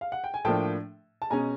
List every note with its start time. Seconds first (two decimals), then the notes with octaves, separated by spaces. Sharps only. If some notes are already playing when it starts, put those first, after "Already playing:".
0.01 F5
0.12 F#5
0.24 G5
0.34 G#5
0.45 A2 F3 A#3 D4 G5 A5
1.22 A5
1.30 B2 G#3 C#4 G#5 A#5